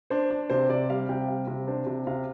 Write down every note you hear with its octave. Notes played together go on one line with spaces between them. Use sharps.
D4 C5
D4
C3 C5
C3 D5
G3 F5
C3 G5
G3 F5
C3
D4 C5
C3
C3 F5